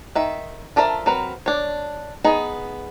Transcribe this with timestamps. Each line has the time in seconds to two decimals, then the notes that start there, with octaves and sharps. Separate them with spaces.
0.15 D#3 E5
0.76 F3 D4 A4 A#4 E5
1.06 F#3 C4 A#4 B4
1.46 D4 C#5
2.24 B3 D#4 G#4